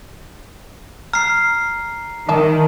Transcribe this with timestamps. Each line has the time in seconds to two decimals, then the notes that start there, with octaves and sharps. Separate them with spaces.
1.13 A#5 F6 C7
2.29 D#3 E4 E5 A5